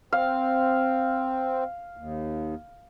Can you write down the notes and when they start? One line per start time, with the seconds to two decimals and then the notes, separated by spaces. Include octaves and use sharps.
0.12 C4 F5
1.97 D#2